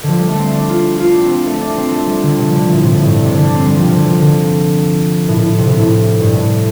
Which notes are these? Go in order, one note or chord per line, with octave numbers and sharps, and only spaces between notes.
D3
F3
G3
A3
C4
D4
F4
F4
D4
C4
C4
A3
D4
C4
A3
G3
D3
C3
F3
D3
F3
A2
C3
A2
G2
C3
D3
D4
C4
G3
F3
C3
D3
F3
D3
A2
A2
C3
C3
A2
G2
A2